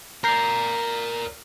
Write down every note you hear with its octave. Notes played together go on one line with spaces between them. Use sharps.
A#4 D5 A#5 G6 C7